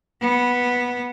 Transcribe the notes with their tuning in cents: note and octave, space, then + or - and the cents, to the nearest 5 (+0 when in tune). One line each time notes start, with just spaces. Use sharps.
B3 -10